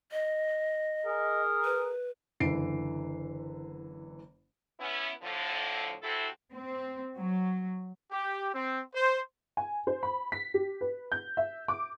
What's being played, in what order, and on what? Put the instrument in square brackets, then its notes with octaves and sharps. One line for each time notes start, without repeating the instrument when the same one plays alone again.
[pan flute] D#5
[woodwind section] G#4 A#4
[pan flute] B4
[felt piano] F#1 D3 E3 C7 D7
[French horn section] B3 C#4 E4
A2 D3 F3
C3 C4 E4 F#4 A4
[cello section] C4
F#3
[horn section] G4
C4
C5
[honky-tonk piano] G#5
C5
B5
B6
G4
B4
G6
E5
D6